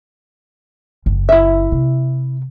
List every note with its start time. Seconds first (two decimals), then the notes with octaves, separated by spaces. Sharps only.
1.06 F#1
1.29 E4 E5
1.72 C3